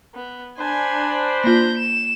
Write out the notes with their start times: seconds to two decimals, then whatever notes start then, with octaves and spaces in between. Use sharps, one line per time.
0.15 B3
0.58 D4 C5 G#5 B5
1.44 A#3 F4 G6 A#6
1.77 E7